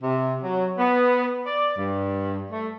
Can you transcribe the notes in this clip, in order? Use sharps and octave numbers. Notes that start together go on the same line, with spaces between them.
C3
F#3
B3
D5
G2
A3